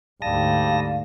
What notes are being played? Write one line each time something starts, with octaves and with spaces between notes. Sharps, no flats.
D2 G#2 G3 F5 A5 D#6 A#6